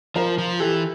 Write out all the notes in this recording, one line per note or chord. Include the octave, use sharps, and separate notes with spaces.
F3 A#4 C5
F3
E3 G4 A4